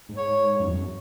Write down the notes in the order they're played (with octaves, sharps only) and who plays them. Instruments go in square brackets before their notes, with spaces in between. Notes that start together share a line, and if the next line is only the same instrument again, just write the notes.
[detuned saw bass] G#2
[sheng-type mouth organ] C#5
[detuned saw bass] F#2
E2
F#2